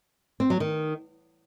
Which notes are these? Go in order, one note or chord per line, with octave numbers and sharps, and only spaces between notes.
C4
F#3
D#3